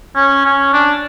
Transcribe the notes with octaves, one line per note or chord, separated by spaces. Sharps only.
C#4
C#4
D4